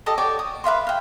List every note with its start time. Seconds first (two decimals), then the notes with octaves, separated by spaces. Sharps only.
0.06 G4 A4 D#5
0.18 F#4 G4 C#5 D5
0.39 D#6
0.64 B4 E5 F5 C6
0.87 F5 G5